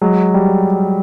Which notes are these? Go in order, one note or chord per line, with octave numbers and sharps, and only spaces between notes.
F#3 G#3
G3